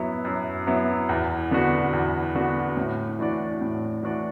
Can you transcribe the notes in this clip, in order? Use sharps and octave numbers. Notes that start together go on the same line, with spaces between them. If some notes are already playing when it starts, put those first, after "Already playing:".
Already playing: F#2 F#3 B3 E4
F#2
F#3 B3 E4
E2
D3 B3 D4 F#4
E2
D3 B3 D4 F#4
A2
E3 D4 F#4 D5
A2
E3 D4 F#4 D5